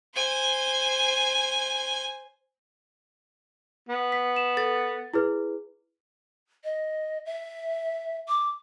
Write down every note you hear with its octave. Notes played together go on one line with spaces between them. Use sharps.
C5 G#5
B3
B6
E7
A4 A6
E4 G#4 B4
D#5
E5
D6